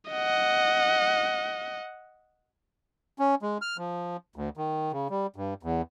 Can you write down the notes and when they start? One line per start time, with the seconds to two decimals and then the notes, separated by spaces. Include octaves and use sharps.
0.11 D#5 F#5
3.19 C#4
3.42 G#3
3.62 F6
3.78 F3
4.36 D2
4.57 D#3
4.92 C#3
5.10 G3
5.36 G2
5.63 E2